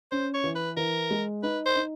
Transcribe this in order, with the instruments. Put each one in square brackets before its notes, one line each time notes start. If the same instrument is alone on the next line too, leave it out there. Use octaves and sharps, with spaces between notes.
[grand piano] C#4 [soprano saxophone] C5
[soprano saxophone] C#5
[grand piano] E3
[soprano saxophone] B4
[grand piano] E3 [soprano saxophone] A#4
[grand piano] G#3
[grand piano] D#4 [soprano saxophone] B4
[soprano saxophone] C5
[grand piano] D#4